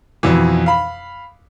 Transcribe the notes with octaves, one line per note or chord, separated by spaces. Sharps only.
F2 B2 E3
F5 B5